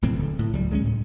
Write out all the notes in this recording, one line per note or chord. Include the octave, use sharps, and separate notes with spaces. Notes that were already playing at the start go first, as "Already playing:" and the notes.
B1 A2 E3 C4
D1 D3
A2
C#2 F#3 G3
D2 G#3 B3 C#4
A2